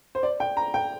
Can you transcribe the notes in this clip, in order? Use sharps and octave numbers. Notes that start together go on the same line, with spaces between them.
C5
D5
G5
A#5
G5